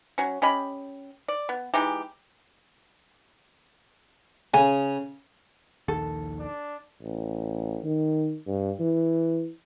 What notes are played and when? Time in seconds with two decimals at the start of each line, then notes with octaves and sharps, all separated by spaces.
0.18 F#3 C#4
0.42 C#4 G4 D#5 B5
1.28 D5
1.49 B3
1.74 E3 G#3 D#4 G4
4.54 C#3 G#5
5.88 A#1 D#2 D#3 A4
6.39 D4
7.02 A1
7.84 D#3
8.47 G2
8.79 E3